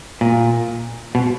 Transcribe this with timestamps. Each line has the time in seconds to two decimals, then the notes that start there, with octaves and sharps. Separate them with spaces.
0.21 A#2
1.15 B2